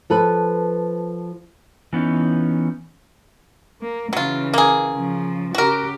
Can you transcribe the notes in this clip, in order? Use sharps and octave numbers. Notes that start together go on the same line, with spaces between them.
F3 A4 B4
E3 B3 C#4 D#4
A#3
C#3 E3 F#3 F4
A#3 G#4
C#3 F3
C#3 F#4 G4 A#4